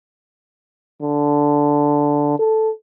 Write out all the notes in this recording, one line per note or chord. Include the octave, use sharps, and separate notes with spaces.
D3
A4